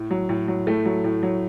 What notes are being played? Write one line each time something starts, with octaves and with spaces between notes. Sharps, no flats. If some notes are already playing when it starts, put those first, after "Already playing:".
Already playing: A2
F#3
A2
F#3
A2 A3
F#3
A2
F#3